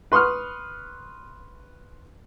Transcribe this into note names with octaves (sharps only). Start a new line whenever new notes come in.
B4 C6 C#6 D#6 F6